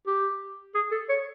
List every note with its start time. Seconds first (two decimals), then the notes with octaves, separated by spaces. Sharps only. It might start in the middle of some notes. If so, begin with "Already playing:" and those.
0.07 G4
0.75 G#4
0.91 A4
1.09 C#5